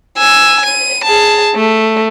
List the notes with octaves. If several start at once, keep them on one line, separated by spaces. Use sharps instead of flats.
G#5 E6
D#7
G#4 A5
A3